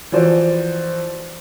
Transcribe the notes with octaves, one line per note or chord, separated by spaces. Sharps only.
E3 F3 F#4 C5 D5